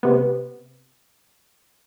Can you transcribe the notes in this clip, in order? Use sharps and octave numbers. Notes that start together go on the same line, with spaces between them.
C3 B3